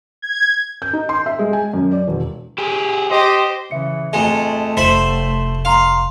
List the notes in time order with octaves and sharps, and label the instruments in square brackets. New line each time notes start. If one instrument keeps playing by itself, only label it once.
[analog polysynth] G#6
[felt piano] G6
D#4
C6
E5
G#3
G#5
F#2
D5
E1
[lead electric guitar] G4 G#4
[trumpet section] G4 D#5 [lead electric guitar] C5
[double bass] C#3 E3 [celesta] E5 C#7
[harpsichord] F2 G#3 [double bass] A3
[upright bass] F1 [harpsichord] C5 E5 B5 [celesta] B6
[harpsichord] F5 [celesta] A#5 C6 F7